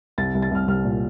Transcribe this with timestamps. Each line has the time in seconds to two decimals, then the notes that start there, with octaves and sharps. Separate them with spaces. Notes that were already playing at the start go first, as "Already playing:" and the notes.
0.18 C2 A6
0.35 C2
0.42 A6
0.51 C2 F6
0.68 C2 F6
0.85 A#2